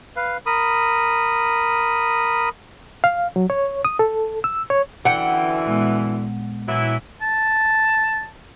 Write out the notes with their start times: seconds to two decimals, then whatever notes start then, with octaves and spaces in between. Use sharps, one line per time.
0.16 B4 F5
0.46 A#4 B5 D#6
3.04 F5
3.36 F#3
3.50 C#5
3.85 D#6
3.99 A4
4.44 E6
4.70 C#5
5.05 F#2 D3 E3 F#5 G5
5.65 A#2 G#3 B3
6.68 A#2 E3 F#3 E4
7.21 A5